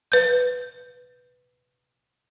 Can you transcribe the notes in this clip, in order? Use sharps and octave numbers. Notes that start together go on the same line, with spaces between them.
B4 G6